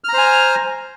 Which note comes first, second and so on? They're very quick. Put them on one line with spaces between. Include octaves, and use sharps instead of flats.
F6 A#5 C5 G#5